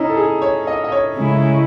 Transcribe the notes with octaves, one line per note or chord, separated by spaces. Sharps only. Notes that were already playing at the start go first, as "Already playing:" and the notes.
Already playing: C#4 D#4 E4
A4
G#4
C#5
D#5
D#5
C#5
C#3 G#3 C#4 E4